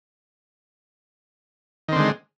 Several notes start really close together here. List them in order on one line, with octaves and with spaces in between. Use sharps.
D#3 C4 D3 G#3